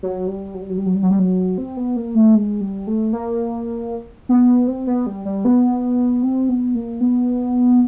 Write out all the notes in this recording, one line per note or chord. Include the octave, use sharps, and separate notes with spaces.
F#3
G3
F#3
G3
F#3
G3
F#3
G3
F#3
G3
F#3
C4
B3
A#3
A3
G#3
G3
A3
A#3
B3
C4
B3
G3
G3
B3
C4
B3
A#3
B3